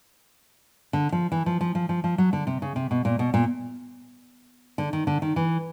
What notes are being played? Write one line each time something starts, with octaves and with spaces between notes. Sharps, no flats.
D3
F3
E3
F3
F3
F3
F3
F3
F#3
D3
C3
C#3
C3
B2
A#2
B2
A#2
D3
D#3
D3
D#3
E3